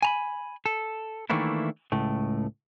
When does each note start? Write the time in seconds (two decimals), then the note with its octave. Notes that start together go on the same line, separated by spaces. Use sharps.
0.02 G#5 A#5 B5
0.66 A4
1.30 D#3 E3 A3 A#3 D4 E4
1.92 C#2 A2 A3